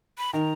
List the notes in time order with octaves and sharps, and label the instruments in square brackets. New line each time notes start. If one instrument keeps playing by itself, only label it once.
[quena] B5
[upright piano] D#3 [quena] A#5